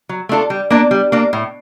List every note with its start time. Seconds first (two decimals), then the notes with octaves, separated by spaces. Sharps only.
0.09 F#3
0.29 A3 D4 F4 A4
0.50 G3
0.70 A#3 D4
0.91 G3
1.12 A#3 D4
1.33 A2